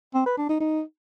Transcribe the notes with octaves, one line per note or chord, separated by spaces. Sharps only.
C4
B4
D4
D#4
D#4